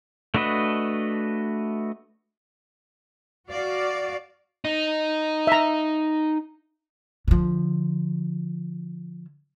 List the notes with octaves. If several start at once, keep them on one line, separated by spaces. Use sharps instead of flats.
A3 D4 F#4 B4 D#5
F#4 D5 F5
D#4
E5 A#5
D3 F3